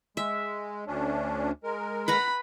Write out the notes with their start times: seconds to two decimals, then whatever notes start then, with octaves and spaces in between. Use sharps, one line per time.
0.17 G#3 E5
0.87 D2 C#4 D4
1.64 G#3 A#4
2.08 B4 F#5 A#5 B5